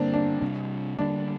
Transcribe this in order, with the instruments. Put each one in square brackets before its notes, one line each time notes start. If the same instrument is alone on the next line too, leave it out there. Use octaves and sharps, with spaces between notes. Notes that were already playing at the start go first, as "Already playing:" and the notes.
Already playing: [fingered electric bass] G2 D3 G3 [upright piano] A#3 C4 D4
[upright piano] D4
[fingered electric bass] C3 G3 D4
[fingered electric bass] D3 G3 A#3 [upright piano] D4